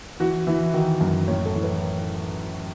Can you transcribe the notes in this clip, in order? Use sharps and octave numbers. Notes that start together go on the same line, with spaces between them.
E3 F#4
E3 E4
D#3 F#4
F#2
A2 C#5
A4
E3
B4